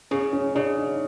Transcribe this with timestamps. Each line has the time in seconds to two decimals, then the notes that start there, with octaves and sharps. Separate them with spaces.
0.11 C#3 C#4
0.33 C#4
0.55 C#3 D4
0.77 D#4